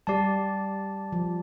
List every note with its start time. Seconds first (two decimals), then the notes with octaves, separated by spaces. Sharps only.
0.07 G3 G4 D5 A5
1.12 F3